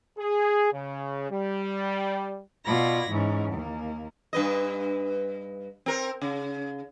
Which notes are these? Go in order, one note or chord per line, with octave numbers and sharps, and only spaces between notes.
G#4
C#3
G3
B2 F4 D5 B5 G#6 A#6
G#2 E3 C#4
D#2 A#3
G2 B4 D#5
C4 A#4
C#3